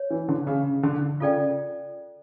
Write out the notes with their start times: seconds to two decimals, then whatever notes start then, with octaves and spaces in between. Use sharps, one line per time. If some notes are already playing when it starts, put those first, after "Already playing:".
Already playing: C#5
0.10 E3
0.28 D3
0.47 C#3
0.83 D3
1.20 C#3 F4 A4 D5 G5